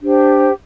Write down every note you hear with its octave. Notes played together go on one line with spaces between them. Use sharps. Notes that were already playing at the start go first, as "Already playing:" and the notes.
D4 G4 C5 G5